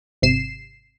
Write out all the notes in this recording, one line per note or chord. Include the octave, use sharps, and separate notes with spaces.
G#1 C3 C7 E7